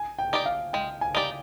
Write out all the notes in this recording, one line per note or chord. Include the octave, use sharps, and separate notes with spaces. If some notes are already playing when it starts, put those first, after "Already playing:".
Already playing: G#5
G5
D#4 G4 D5
F5
G#3 G5
G#5
D#4 G4 D5